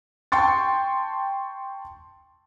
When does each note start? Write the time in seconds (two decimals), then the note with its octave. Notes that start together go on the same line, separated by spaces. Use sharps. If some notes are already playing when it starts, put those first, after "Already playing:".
0.32 G5 A5 C6 C#6 A6